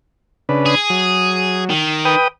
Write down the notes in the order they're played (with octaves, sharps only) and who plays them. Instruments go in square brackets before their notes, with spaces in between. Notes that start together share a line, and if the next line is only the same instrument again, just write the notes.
[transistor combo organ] C#3 D4 B4
[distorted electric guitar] G#4
[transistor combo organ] F#3
[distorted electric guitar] D#3
[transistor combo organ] B4 G5 D#6